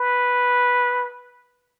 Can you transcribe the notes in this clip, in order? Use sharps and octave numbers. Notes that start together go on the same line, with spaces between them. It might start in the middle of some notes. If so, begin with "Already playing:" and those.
Already playing: B4